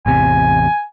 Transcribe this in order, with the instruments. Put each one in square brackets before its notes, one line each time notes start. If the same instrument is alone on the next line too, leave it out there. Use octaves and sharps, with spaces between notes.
[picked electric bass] A1 E2 C3 [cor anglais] G#5